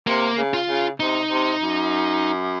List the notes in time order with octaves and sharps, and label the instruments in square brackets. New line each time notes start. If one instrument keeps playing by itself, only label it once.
[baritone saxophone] C3 [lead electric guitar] A#3
[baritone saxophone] C#3
[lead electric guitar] F4
[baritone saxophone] C#3
[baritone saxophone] C3 [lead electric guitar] D#4
[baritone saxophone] C3
F#2